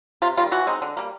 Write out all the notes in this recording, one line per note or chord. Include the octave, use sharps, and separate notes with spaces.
C3 F4
D#3 G3 F4
E3 F#4
G#3 C4 D#4
D3
G3 A#3